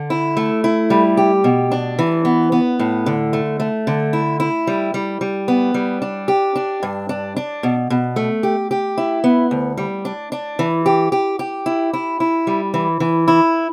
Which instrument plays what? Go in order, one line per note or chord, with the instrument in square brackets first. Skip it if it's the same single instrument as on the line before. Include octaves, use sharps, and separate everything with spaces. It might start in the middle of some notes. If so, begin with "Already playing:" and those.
Already playing: [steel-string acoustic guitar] D3
E4
A3
E4
G3
G4
B2
D4
E3
B3
B3
A2
D3
A3
A3
D3
E4
E4
G3
G3
G3
B3
G3
D4
G4
D4
G2
D4
D4
B2
B2
A3
G4
G4
E4
B3
D2
G3
D4
D4
E3
G4
G4
G4
E4
E4
E4
G3
E3
E3
E4